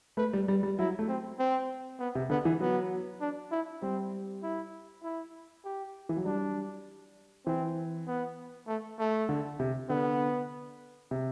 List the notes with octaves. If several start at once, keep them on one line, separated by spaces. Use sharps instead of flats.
A3 B4
G3
G3
G3
F#3 E4
A3
C4
C4
B3
C3
D3 B3
E3
F#3 B3
D4
E4
G3 C4
E4
E4
G4
E3
F#3
G3 D4
E3 C4
B3
A3
A3
D3
C3
D3 B3
C3